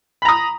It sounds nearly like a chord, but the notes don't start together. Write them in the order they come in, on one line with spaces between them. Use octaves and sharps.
B5 A#5 D#6